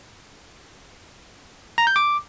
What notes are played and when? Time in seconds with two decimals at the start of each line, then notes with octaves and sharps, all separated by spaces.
1.78 A#5
1.87 G6
1.96 D6